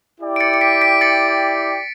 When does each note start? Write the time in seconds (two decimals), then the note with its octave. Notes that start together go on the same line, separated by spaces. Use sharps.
0.21 E4 G4 D5 G5
0.36 D7
0.40 A6 C#7
0.54 C#7
0.61 B6 D7
0.82 B6 D7
1.01 A6 C#7